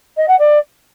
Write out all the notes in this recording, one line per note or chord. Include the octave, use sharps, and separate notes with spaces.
D#5
F#5
D5